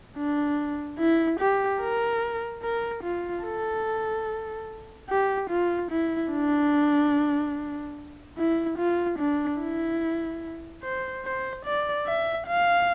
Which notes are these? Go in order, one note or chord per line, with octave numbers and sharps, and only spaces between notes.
D4
E4
G4
A#4
A#4
F4
A4
G4
F4
E4
D4
E4
F4
D4
E4
C5
C5
D5
E5
F5